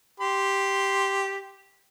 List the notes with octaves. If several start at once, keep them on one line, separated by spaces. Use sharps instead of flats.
G4 C6